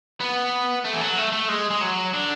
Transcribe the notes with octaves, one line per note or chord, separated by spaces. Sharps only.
B3
A3
E3
F#3
A3
A3
G#3
G#3
F#3
D3